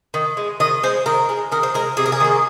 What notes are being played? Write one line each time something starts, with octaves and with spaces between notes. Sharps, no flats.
D#3
G#3
D#3 D#5
G#3 C5
D#3 A#4
G#3
D#3 A#4
C5
G#3 A#4
C3 G#4
A#4
G#4
D#3 A#3